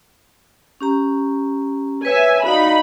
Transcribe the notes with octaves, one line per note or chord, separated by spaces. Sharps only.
C#4 G4 A#5
B4 C#5 E5 G#5
D#4 F#4 D5 F5 B5